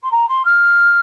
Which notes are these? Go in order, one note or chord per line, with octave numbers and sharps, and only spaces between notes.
C6
A#5
C6
F6